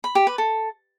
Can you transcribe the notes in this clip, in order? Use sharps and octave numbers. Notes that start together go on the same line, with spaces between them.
B5
G4
B4
A4